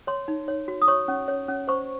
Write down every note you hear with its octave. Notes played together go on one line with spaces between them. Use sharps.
C#5 C6
D#4
C#5
F#4
D#6
C#5 C#6
C#4
C#5
C#4
C5 C#6